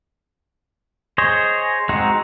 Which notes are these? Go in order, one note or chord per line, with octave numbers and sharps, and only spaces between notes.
G#4 C5 C#5 D#5
G#3 C4 D#4 F#4